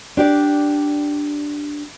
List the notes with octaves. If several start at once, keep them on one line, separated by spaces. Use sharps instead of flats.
D4 G4 D5